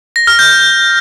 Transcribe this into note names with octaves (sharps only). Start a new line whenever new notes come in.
A#6
F6
G6